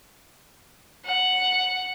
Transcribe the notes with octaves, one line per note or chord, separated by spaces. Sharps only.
F#5